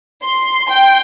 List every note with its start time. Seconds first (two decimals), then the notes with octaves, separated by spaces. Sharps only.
0.24 C6
0.69 G5